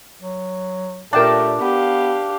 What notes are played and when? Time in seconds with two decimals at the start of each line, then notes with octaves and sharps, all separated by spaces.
0.22 F#3
1.13 A#2 A3 D4 G4 A#4 G5 A5
1.60 B3 G4 F5